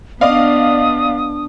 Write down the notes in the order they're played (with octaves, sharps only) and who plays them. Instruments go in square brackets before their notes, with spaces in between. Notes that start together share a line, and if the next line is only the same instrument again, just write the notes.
[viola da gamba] B3 D4 [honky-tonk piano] D5 D#5 F5 [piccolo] D#6